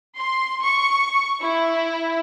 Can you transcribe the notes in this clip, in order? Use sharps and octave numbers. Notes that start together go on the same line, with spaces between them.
C6
C#6
E4